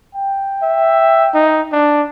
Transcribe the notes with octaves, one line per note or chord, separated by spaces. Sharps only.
G5
E5
D#4
D4